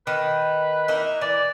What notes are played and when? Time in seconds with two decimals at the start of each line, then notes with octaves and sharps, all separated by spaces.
0.07 D#3 B4
0.88 A#3 D#4 E4
1.21 E3 D5